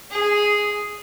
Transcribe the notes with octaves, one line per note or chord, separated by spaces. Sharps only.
G#4